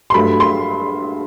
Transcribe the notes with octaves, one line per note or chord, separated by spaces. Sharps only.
C6
G2 F#3 A3 B5
C6